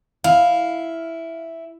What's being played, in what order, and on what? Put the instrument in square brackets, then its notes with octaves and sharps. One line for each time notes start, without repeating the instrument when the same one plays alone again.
[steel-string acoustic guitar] E4 [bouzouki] F5